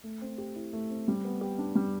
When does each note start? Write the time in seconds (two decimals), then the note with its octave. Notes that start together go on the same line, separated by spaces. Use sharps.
0.04 A3
0.22 C4
0.38 G4
0.56 E4
0.73 A3
0.90 C4
1.08 G3
1.25 B3
1.41 G4
1.58 D4
1.75 G3